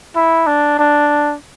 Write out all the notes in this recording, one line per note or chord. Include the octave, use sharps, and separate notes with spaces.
E4
D4
D4